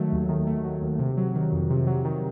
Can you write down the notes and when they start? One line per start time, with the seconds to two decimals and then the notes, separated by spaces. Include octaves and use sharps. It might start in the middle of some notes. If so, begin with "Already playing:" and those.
Already playing: D#3 F#3 A3
0.12 D#2
0.29 D#3
0.47 A3
0.64 F#3
0.82 D#2
0.99 C3
1.17 F#3
1.35 D#3
1.53 F2
1.70 C3
1.87 F#3
2.05 D#3